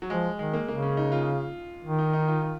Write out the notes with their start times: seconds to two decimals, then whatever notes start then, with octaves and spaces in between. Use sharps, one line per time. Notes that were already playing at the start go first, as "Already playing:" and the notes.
0.02 F#3
0.09 F3 G#3
0.39 D#3 G#3
0.54 A#3
0.68 C#3 A#3
0.82 C#4
0.97 D#4
1.12 F4
1.85 D#3
1.99 D#4
2.13 D#4
2.28 F4
2.42 F4